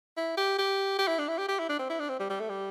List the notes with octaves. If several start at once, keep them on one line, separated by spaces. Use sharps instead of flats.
E4
G4
G4
G4
E4
D4
E4
G4
G4
E4
D4
C4
E4
D4
C4
G3
G3
A3
G3